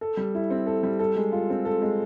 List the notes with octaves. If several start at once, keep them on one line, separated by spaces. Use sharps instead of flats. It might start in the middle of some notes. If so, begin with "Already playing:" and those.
A4
G3
E4
C4
A4
G3
A4
G#3
F4
C4
A4
G#3